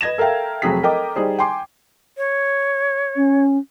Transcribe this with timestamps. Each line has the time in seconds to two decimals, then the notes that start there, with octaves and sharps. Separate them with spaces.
0.01 B4 D#5 G#6 A#6 E7
0.18 A4 A#4 E5 F5 G5
0.62 F1 F#3 C4 G#4 A4 B6
0.83 A4 A#4 D#5 G5 D6
1.16 G3 D#4 G#4 C5
1.39 G5 G#5 C6 D6
2.17 C#5
3.16 C#4